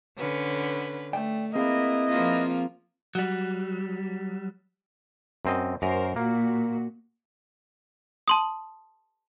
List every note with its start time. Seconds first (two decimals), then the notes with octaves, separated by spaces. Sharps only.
0.18 D3 C#4 B4
1.13 A3 D5 G5
1.55 A#3 C4 E4 G#4 B4 D#5 F5
2.09 F3 A#3 F4
3.15 F#3 G3
5.45 F#2 C4 D#5
5.82 F#2 A#4 C5 A#5
6.16 A#2 A#3 F#4
8.28 A5 C6 D#6